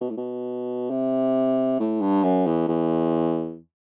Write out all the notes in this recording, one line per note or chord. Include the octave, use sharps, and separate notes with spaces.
B2
A2
B2
C3
A2
G2
F#2
E2
E2